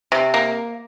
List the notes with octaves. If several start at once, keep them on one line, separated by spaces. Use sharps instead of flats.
C3
A#3